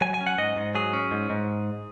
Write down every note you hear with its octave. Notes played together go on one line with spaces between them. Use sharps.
F#3 G#5
G#5
C#4
F#5
G#2 D#5
G#2
F#3 G#4
C#4
G#2
G#2